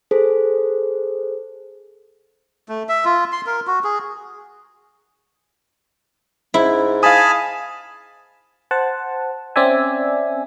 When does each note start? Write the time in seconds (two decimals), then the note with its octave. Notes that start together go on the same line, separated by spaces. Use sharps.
0.11 G#4 A4 C5
2.69 A3
2.89 E5
3.05 F4
3.32 C6
3.46 A#4
3.67 F#4
3.84 G#4
6.54 G#2 E4
7.03 F5 G#5 A5 B5 D#6
8.71 C5 F#5 A5
9.56 C4 C#4 D5 E5 G#5